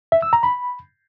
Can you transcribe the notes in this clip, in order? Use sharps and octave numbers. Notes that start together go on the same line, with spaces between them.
E5
E6
A#5
B5